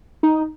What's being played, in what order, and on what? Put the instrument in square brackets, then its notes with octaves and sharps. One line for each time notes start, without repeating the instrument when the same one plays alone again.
[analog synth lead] D#4